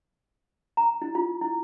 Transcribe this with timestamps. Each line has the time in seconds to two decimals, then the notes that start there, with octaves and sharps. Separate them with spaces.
0.77 A#5
1.02 E4
1.15 F4
1.41 E4